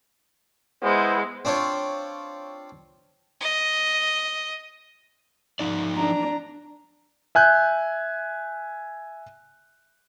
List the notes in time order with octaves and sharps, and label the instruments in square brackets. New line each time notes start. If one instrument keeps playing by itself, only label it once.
[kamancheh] G#3 [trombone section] B3 E4 C5
[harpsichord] C4 D4 F4 C#5
[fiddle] D#5
[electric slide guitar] F3 D#4 D5
[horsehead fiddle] D4 A#5
[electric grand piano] E5 G#5 F#6 G6